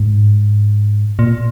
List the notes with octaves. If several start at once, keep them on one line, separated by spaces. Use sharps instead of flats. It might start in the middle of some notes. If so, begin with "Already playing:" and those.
Already playing: G#2
A#2